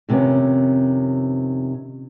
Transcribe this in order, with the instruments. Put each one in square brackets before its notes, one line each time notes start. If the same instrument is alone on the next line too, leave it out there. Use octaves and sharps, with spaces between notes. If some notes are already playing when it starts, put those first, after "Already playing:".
[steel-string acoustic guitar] F2 C3 D#3 B3 C#4